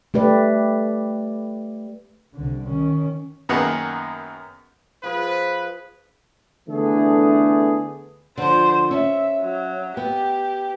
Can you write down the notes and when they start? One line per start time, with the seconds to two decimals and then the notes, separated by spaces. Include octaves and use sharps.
0.14 A3 G4 B4 D5
2.35 C2 D3
2.67 D#3 C#4
3.49 F#2 D#3 A#3 B3 G#4 F#5
5.03 F3 G#4 B4
6.68 D3 E3 A3 B3 D4 G#4
8.37 D3 F3 C5
8.91 C#4 E5
9.42 F#3
9.97 B3 G4